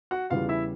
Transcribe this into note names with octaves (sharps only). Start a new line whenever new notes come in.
F#4 F#5
E2 C#3 E3 G3 F4 F5
E4 E5